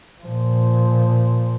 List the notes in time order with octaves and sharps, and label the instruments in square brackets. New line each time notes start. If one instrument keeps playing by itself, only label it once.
[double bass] A#2 F3